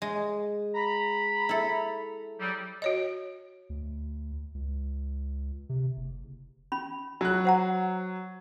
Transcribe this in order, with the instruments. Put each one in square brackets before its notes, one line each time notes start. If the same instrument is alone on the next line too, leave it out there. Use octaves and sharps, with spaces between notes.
[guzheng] G#3
[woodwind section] A#5 B5
[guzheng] E4 A4
[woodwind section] F#3 G3
[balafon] F#4 C#5 D#5
[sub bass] D2
C#2
C3
F#1
[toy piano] C#4 B5
[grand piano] F#3 F#6
[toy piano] C5 F#5 A#5